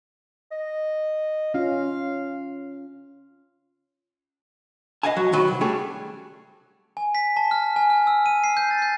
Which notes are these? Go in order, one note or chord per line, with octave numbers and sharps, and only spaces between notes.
D#5
C#4 F4 F5
B4 D#5 F5 F#5 G#5 A5
F#3
D#3 F#3 B4
C2
G3 A3 C#4 G#4 A4
G#5
B6
A5
F6
G#5
F6
E6
D#7
C7
G6
A6
G6